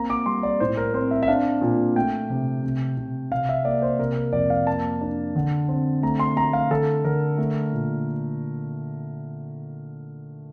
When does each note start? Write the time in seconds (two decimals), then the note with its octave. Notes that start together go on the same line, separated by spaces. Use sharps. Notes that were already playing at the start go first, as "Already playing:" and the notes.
Already playing: A#3 C4 A#5
0.10 D6
0.26 G3 C6
0.43 D5
0.60 A2 C5
0.77 A#4
0.94 C4 C5
1.11 E5
1.23 E5
1.28 D4 F5
1.61 A#2
1.96 A3 G5
2.30 C3
2.64 C3
2.97 C3
3.32 C3 F5
3.49 E5
3.65 A#3 D5
3.82 C5
3.99 C3 A#4
4.16 A#4
4.33 F2 D5
4.50 F5
4.67 A#3 A5
5.01 D4
5.36 D3
5.68 C4
6.03 A3 A#5
6.19 C6
6.36 A3 A#5
6.53 F5
6.70 D3 A4
7.04 D3 A#4
7.38 A3
7.73 A#2